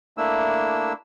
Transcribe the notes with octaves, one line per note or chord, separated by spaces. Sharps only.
A3 A#3 D4 E4 E6